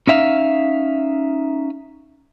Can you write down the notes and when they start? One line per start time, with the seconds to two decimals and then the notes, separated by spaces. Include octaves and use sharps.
0.07 C#4 D#4 E5 F5